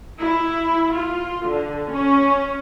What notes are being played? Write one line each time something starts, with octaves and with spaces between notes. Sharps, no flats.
E4
F4
D3
C#4